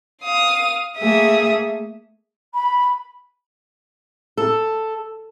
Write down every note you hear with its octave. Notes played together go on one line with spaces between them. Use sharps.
F5 D#6
A3 A#3 G#4 E5 D#6
B5
A4